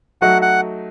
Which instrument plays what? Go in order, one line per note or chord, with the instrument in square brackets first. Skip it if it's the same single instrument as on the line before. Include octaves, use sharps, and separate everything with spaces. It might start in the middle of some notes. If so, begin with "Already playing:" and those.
[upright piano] F#3 A3 D#4 F#4 [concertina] F#5
[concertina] F#5